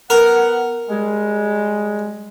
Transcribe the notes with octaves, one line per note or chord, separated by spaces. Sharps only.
B3 A#4 F#5
G3 G#3